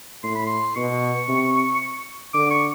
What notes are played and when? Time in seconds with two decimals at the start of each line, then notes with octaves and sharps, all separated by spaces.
0.23 A2 C6
0.35 B5
0.46 C6
0.76 B2 C#6
1.28 C3
2.34 D3 D6
2.51 C#6